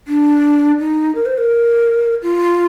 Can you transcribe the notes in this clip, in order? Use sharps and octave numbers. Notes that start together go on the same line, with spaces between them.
D4
D#4
A#4
C5
A#4
F4